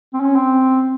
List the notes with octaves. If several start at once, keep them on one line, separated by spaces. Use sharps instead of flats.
C4
C#4
C4